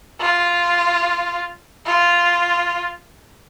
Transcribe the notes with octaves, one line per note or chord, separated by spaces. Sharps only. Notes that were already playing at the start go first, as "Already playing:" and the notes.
F4
F4